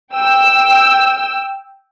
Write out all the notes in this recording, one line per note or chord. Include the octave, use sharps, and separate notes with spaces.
G5 E6